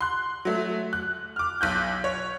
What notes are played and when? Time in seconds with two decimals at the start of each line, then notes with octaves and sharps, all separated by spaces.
0.01 C6 F#6
0.45 F#3 A3
0.93 F#6
1.36 D6 F6
1.61 B1 F#6 G6
2.04 C#5